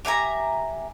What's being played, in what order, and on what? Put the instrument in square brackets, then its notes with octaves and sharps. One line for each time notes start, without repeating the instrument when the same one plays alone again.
[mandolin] G4 E5 G#5 A#5